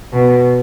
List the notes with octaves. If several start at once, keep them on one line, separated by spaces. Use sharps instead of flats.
B2